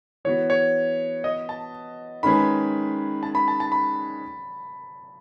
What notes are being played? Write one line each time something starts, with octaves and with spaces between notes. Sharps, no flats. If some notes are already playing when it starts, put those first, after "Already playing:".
E3 B3 F#4 B4 C#5
C#5
D#5
A5
D#3 G#3 C#4 G#4 B4 B5
A5
B5
A5
A5
B5